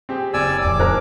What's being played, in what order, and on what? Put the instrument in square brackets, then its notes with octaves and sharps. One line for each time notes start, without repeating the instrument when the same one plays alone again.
[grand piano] C4 G4 G#4
[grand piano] F#1 [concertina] D5 G#5 E6
[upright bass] D1 F2 [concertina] D6
[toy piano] D#4 C5 [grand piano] G#4 A#4